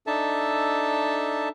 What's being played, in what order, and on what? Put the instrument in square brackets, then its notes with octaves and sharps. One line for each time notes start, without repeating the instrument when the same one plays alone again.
[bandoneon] D4 D#4 A4 E5 A5